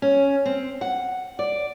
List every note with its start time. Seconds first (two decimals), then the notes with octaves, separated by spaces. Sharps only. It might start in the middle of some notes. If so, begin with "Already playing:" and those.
0.02 C#4
0.46 C4
0.81 F#5
1.39 D5